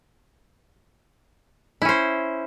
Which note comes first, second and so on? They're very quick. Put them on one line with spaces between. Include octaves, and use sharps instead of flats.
E4 C#4 C5